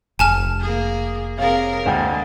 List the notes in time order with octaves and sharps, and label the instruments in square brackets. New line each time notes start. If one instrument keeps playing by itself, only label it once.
[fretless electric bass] F1 [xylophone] G#5 A5 F6
[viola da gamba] A#3 G#4
[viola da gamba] C3 G#4 A#4 [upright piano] C#5 F5
[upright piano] D2 G#3 G5 [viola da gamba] D3 A#3